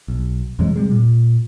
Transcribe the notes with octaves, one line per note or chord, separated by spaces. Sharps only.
B1
E2 C3 F#3 G#3
C3 G3 G#3
A#2